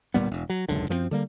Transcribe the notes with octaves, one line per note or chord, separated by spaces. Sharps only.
D1 A#2 G3 B3
E1
F#3
D#1 C#2 F#2 D3
F#2 F3 G#3 C4
D3 G3 A#3